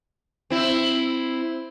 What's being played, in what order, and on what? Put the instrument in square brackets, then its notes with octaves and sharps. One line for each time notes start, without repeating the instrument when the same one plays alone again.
[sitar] C4 E4